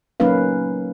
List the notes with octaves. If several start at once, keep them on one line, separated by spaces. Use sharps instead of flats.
F#3 A#3 C#4 D#4 B4 F5